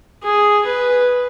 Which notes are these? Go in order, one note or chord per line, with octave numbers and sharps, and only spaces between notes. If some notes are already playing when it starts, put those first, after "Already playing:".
G#4
B4